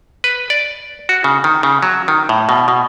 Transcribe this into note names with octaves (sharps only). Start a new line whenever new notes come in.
B4
D5
F#4
C#3
D#3
C#3
F#3
D#3
A2
B2
B2